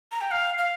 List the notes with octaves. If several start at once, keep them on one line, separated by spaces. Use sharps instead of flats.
A#5
G5
F5
F5